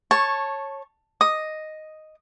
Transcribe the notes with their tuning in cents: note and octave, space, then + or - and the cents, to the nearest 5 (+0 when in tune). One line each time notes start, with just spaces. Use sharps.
C#5 -15 A5 -5 C#6 +0
D#5 +0 D#6 +0